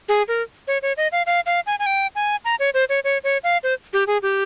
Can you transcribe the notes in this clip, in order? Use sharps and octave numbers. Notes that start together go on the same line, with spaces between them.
G#4
A#4
C#5
C#5
D#5
F5
F5
F5
G#5
G#5
G5
G#5
A#5
C#5
C5
C#5
C#5
C#5
F5
C5
G4
G#4
G4